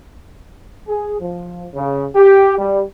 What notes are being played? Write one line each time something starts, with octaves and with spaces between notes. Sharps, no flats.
G#4
F3
C#3
G4
G3